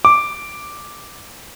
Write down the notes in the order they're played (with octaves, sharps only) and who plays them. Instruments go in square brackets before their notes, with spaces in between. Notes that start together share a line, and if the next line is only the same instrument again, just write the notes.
[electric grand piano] D6